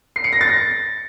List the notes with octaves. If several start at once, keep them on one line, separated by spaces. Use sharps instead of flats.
C7
C#7
A#6
A6
A#6